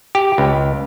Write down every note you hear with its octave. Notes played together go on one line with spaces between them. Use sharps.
G4
C#2